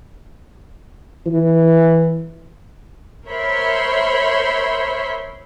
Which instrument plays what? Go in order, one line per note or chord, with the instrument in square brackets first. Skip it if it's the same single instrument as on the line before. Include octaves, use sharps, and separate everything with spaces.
[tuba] E3
[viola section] A#4 C5 C#5 E5 B5 C6